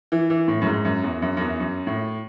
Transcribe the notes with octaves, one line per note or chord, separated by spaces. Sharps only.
E3
E3
A2
F#2
G#2
F#2
E2
F#2
F#2
E2
F#2
A2